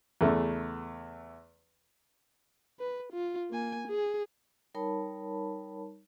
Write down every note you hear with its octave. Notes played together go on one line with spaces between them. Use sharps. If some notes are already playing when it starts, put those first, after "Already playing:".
E2 C#3 A3
B4
F4
A#3 G#5
G#4
G3 D#4 A#4 C#5 A5 B5